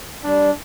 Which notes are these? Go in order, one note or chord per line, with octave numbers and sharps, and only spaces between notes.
G3 D4